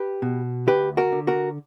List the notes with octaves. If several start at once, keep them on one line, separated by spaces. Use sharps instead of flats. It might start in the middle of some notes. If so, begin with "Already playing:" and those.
Already playing: G4 B4
B2
D2 G4 B4
F#4 A#4
D3
F#4 A#4